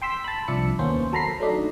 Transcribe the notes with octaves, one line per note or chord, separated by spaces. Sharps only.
G5 C6 E6 B6
A5 B5
C2 F3 D4 E5 C#7
D#2 A#3 B3 C#4 C5
F#3 A4 A#4 A#5 B5 C7
F#3 A3 D4 D#4